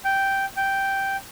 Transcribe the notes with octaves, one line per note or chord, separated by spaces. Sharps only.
G5
G5